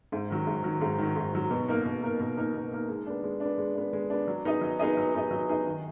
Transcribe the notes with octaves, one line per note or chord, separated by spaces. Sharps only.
G#2
D#3 F#3
G#2
D#3 F#3
G#2
D#3 F#3
G#2
D#3 F#3
B2
A#3 D#4 A#4
B2
A#3 D#4 A#4
B2
A#3 D#4 A#4
B2
A#3 D#4 A#4
G#3
B3 D4
G#3
B3 D4
G#3
B3 D4
G#3
B3 D4
F#3
B3 D#4 G#4 D#5
F#3
B3 D#4 G#4 D#5
F#3
B3 D#4 G#4 D#5
F#3
B3 D#4 G#4 D#5
D#3